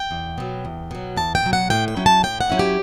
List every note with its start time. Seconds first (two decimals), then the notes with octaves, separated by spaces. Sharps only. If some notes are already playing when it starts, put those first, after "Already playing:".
Already playing: G5
0.11 E2
0.38 B2 F#3
0.65 E2
0.91 B2 F#3
1.17 E2 A5
1.35 G5
1.43 B2 F#3
1.53 F#5
1.70 A2 G5
1.88 G5
1.97 F#3 C#4 E4
2.06 A5
2.23 A2 G5
2.41 F#5
2.50 F#3 C#4 E4
2.59 G4